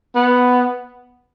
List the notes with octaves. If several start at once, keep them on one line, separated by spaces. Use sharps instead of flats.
B3